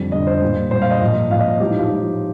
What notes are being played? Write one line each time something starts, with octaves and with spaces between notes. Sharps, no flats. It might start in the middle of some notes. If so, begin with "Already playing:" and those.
Already playing: F2 D3 G3
F2 D3 G3 D#5
C5
A#2 G3
A#2 G3 C5
F5
D#5
A#2 F3
A#2 F3 F5
D#5
A2 F3 G4
D#4
F4
A2 F3